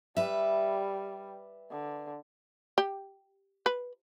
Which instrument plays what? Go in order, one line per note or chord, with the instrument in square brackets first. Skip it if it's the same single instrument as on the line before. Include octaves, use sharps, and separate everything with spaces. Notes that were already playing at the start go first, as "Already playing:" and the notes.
[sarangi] G3 [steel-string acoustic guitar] B4 E5
[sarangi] D3
[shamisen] G4
B4